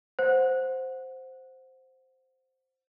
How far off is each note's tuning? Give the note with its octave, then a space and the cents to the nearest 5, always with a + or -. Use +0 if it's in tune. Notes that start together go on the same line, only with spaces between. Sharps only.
C5 +0 F#5 -15